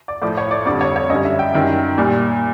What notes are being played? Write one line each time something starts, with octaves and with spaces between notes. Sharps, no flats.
D5
A2 F3 D5
C#5
D5
F2 D3 G3 D5
C#5
C#5
F#2 D3 G3 D#5
E5
G5
F#2 D#3 G3
A#2 G3